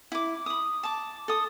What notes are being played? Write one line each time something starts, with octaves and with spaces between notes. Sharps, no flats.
E4 D6
B5 D#6
A5 D6
A4 D#6